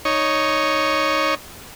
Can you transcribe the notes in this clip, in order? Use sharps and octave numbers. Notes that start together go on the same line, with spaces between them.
D#4 C#5